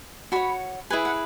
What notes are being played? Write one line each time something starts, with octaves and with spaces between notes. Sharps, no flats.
F#4 C#5 B5
E4 G#4 B4 G#5
F#5